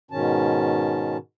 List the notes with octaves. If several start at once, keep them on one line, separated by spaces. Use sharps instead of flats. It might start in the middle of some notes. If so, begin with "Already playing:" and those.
G#2 B2 D#3 C#4 A5